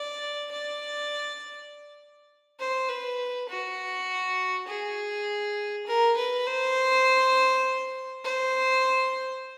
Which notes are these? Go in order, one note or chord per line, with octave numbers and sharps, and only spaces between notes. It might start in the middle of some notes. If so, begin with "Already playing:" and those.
Already playing: D5
D5
C5
B4
F#4
G#4
A#4
B4
C5
C5